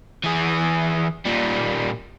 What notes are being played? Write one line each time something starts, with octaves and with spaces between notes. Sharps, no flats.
E3 G#4
A#2 G3